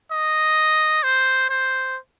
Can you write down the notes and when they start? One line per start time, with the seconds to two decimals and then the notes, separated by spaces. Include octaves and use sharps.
0.11 D#5
1.03 C5
1.50 C5